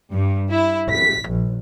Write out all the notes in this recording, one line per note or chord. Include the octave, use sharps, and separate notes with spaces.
G2
E4
B6
A#1